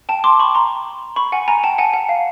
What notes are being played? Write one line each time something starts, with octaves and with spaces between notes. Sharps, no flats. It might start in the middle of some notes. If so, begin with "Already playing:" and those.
G5 A5
C6 D6
B5 C#6
A#5 C6
B5 C#6
F#5 G#5
G#5 A#5
G5 A5
F#5 G#5
F#5
F5